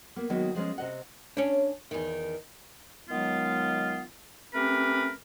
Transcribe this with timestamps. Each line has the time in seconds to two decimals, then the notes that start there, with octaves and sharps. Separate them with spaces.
0.16 A#3 B3
0.30 D#3 F#3 G#3 A#3 B3
0.55 F3 G#3 B3 C#4
0.78 C3 D#5 F#5
1.37 C#4 D4
1.91 E2 D#3
3.10 D#3 F#3 G#3 B3 F4
4.54 A3 C4 C#4 G4 A#4 B4